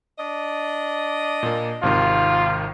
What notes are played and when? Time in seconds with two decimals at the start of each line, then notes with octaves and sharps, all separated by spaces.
0.19 D4 D#5
1.43 A#2 A#3
1.83 G#1 C3 D#3 F4